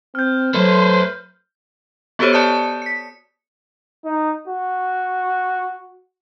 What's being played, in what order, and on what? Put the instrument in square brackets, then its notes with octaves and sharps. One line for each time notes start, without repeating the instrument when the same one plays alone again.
[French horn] C4 [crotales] F6 G6
[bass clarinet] F#3 [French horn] A3 [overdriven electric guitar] B4 C5
[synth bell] B3 F#4 G4 A4 C5 C#5
D5 A5 D#6 G6 C#7
B6 C#7
[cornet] D#4
F#4